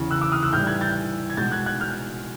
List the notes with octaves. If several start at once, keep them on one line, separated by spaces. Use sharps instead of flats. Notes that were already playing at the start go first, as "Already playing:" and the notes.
Already playing: E2 C#3 E3
E6 F#6
D6 E6
D#6 F6
E6 F#6
A2 E3 G3 F6 G6
F#6 G#6
G6 A6
G#6
B2 G#3 G6 A6
F#6 G#6
F#6 G#6
F6 G6